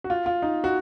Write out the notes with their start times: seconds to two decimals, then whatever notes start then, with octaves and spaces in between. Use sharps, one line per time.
0.04 F#4
0.10 F4
0.26 F4
0.42 D#4
0.64 F#4